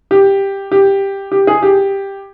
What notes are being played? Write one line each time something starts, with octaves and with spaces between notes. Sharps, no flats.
G4
G4
G4
G#4
G4